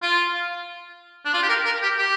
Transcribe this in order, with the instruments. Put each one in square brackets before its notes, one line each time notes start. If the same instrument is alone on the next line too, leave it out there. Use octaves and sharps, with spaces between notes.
[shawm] F4
D4
F4
G4
A#4
A#4
G4
G4